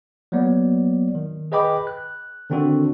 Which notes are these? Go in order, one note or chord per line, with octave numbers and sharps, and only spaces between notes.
F#3 A#3 B3 D5
D#3
G#4 B4 D#5 G5 B5 D6
F#6
D3 D#3 C4 D4 F#4 A4